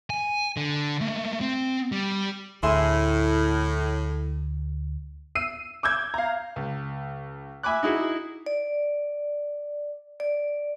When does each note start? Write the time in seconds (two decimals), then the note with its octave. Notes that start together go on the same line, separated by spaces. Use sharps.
0.10 G#5
0.57 D3
1.01 A3 A#3
1.41 C4
1.92 G3
2.63 D2 A2 G#4 E5 C6
5.35 E6 C7 D#7
5.83 D6 E6 G6 G#6
6.14 F5 A#5
6.56 C#2
7.63 E5 G#5 B5 D6 F#6
7.83 D#4 E4 F#4 G#4 F#5
8.46 D5
10.20 D5